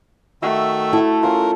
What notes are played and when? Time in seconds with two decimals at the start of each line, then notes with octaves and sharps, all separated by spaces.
0.42 D#3 A3 F#4 E5
0.93 E4 A4
1.23 C#4 F4 A#4